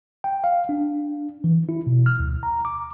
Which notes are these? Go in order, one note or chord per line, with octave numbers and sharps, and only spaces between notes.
G5
F5
D4
E3
E4
B2
F6
D2
A#5
D6